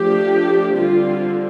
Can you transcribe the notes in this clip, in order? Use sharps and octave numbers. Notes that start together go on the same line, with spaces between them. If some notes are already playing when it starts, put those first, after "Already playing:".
Already playing: F3 A3 D4 G4
D3 G3 C4 F4